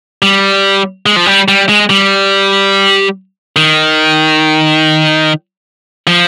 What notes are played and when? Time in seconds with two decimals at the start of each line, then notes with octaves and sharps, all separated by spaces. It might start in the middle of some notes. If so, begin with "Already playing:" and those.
0.22 G3
1.06 G#3
1.16 F3
1.26 G3
1.48 G3
1.69 G#3
1.90 G3
3.56 D#3
6.07 F3